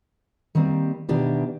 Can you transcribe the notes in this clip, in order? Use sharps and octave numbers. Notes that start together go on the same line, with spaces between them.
D#3 G3 A#3 C4
B2 D#3 D4 E4 G4